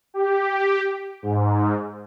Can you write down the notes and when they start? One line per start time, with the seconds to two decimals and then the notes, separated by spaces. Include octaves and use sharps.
0.14 G4
1.22 G#2